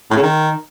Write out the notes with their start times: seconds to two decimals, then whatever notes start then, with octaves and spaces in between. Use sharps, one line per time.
0.11 A2
0.17 C#3
0.22 D#3